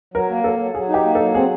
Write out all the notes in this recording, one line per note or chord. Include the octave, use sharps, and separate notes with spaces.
F#3 A#4
A#3
F#3 A4
F#3
F#3 G#4
D#4
G4
A#3
A4
F#3
C4 G#4